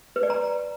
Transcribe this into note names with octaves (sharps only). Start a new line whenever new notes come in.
B4
D5
A#5